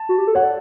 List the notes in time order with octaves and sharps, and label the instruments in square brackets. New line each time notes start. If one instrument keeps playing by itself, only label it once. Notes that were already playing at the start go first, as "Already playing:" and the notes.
Already playing: [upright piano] A5
[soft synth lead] F#4
G4
A4
[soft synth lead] C#5 [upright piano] F#5
[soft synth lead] D5